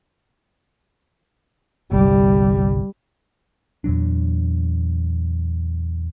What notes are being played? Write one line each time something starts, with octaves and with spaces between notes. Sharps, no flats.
G1 C2 G3
E2 A#2 F#3 D4